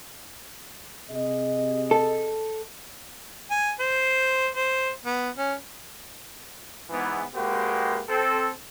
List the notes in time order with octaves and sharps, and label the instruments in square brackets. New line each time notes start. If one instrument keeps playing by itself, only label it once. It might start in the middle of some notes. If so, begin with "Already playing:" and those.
[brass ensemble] C3 G#4 D#5
[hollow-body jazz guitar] A4
[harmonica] G#5
C5
C5
B3
C#4
[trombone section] G#2 E3 B3
G#3 A#3 C4 F#4 G4 B4
C4 A4